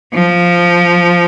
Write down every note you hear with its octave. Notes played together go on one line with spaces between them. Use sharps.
F3